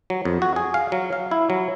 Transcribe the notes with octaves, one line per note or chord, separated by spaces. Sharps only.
F#3
F2
F#4
G#4
F5
F#3
F5
E4
F#3